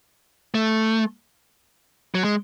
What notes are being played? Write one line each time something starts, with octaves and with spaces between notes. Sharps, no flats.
A3
F#3
G#3